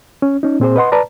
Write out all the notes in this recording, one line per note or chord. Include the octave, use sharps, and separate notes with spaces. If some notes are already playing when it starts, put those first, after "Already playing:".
C#4
C#4 D#4
A#2 C4 G#4 C5
B4 D#5 F#5 C6
B4 D5 A5 A#5